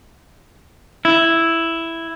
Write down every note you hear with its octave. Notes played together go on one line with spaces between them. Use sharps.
E4